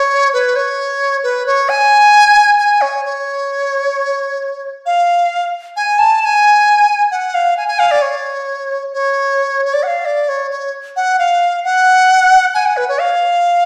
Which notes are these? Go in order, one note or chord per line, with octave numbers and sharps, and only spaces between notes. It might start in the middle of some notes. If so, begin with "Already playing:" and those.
Already playing: C#5
B4
C#5
B4
C#5
G#5
G#5
C#5
C#5
F5
G#5
A5
A5
G#5
F#5
F5
G#5
G#5
F5
D5
C#5
C#5
C#5
D5
F#5
F5
D5
C#5
C#5
F#5
F5
F#5
G#5
F#5
B4
C#5
F5